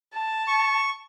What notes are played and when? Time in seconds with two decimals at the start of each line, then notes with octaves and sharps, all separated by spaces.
0.14 A5
0.48 C#6